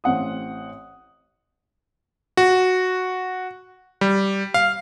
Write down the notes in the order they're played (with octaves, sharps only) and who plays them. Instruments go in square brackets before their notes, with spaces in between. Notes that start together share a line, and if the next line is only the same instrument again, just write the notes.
[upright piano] A1 C4 F#5 D#6
[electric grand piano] F#4
G3
F5